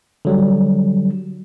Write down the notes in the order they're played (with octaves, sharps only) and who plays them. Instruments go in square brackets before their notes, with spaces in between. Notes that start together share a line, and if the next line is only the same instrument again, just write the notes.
[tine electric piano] D3 F#3 G3